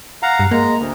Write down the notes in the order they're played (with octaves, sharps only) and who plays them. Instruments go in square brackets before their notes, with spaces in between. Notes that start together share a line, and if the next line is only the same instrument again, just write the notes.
[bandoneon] F5 F#5 A#5
[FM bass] G2
[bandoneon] G#3 A#5 [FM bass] A#3
[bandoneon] D2